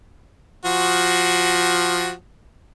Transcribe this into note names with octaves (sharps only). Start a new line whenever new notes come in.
F3 F#4